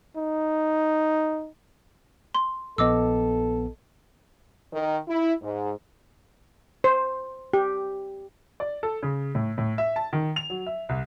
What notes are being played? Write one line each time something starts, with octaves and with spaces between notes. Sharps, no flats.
D#4
C6
A#1 B3 A4 D#5 D6 E6
D#3
E4
G#2
C5
G4
D5
A4
C#3
A2
A2
E5
A5
D#3
F7
F#3
E5
C2